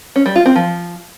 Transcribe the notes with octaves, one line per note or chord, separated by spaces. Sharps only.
C#4
G3
F4
C4
F3